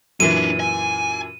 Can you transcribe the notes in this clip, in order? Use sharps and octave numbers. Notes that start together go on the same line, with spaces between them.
F#2 A#2 E3 C#4 D4 D#7
G#5